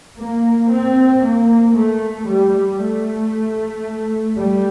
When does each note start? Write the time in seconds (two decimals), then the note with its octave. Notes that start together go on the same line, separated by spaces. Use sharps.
0.19 A#3
0.71 C4
1.23 A#3
1.75 A3
2.27 G3
2.80 A3
4.36 G3